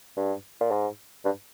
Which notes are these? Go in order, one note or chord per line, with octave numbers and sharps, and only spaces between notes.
G2
A#2
G#2
G2